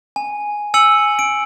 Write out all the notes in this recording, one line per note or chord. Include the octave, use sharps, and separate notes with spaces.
G#5
G#5 E6 C#7 F#7
D7